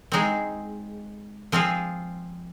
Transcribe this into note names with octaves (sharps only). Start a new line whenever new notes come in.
G#3 C4 D#4 G#4
F3 C4 F4 G#4